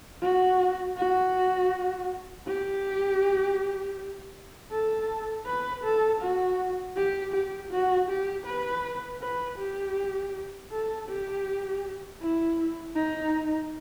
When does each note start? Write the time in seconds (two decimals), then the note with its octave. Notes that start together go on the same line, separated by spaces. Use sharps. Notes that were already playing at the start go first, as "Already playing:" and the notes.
0.22 F#4
0.97 F#4
2.46 G4
4.72 A4
5.46 B4
5.84 A4
6.21 F#4
6.96 G4
7.33 G4
7.71 F#4
8.09 G4
8.46 B4
9.21 B4
9.58 G4
10.72 A4
11.09 G4
12.21 E4
12.96 D#4